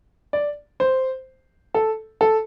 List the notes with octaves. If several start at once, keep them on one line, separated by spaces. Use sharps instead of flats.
D5
C5
A4
A4